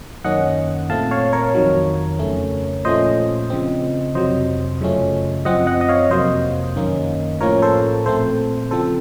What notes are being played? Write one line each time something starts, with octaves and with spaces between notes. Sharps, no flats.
F#2 D#3 A#3 C#4 D#5 F#5
A#2 A3 C4 F5 A5
C#5 F5
A#4 C#5
F2 D#3 F#3
F2 C#3 A3 C#4
A#2 F3 A3 C#4 C5 D#5
C#3 F3 C4
F2 C3 F#3 C5 D#5
F#2 C#3 F3 A3 C#4
F#2 F3 C4 D#5 F#5
D#5 F#5
D#5
C#5 F5
F2 C3 F#3 A#3 C5 D#5
F#2 D#3 A#3 C#4
A2 F3 A#3 C#4 A#4 C#5
A4 C5
A#2 A3 C4 A4 C5
C#3 F3 C4 A4 C5